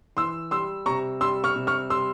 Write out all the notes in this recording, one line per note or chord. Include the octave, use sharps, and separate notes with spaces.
E3 C6 E6
G3 C6 E6
C3 A#5 C#6
G3 C6 E6
C#6 F6
C3
C#6 F6
G3 C6 E6